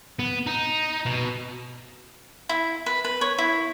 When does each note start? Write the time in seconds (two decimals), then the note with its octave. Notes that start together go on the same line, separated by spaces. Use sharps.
0.19 B3
0.47 D#4
1.06 B2
2.49 E4
2.86 B4
3.04 B4
3.21 C#5
3.38 E4